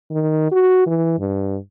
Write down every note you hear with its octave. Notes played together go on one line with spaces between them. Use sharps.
D#3
F#4
E3
G2